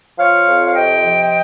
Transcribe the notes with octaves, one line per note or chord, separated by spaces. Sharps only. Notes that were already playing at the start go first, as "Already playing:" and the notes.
F3 C#5 F5
F2
F5
C3 D#5 G5
F3